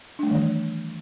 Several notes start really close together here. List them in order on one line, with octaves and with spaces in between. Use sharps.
D4 A3 G3 D#3 E3